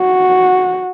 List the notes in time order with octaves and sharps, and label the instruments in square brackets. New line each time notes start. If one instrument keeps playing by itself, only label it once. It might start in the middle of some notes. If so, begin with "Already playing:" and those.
Already playing: [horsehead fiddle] F#4